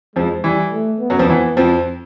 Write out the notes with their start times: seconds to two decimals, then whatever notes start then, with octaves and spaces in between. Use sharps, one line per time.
0.16 F2 F3 G#3
0.44 E3 G3
0.72 A3
1.01 B3
1.10 F#2 F#3
1.19 F2 F3
1.29 E3 B3
1.57 F2 F3 C4